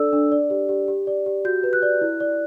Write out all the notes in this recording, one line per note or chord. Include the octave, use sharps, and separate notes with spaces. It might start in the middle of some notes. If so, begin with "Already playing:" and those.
Already playing: D4 A4 D5 E6
D4
D5
G4
G4
G4
D5
G4
F#4 G6
B4
F#6
D5
E4
D5